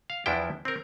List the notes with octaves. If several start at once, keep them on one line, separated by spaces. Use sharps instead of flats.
F5
E2 F3 B3 D4 E4 G5
C4 A#4